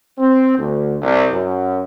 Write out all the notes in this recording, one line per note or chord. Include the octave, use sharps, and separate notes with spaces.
C4
D2
C2
F#2